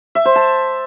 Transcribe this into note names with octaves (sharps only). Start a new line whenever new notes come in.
E5
C5
A5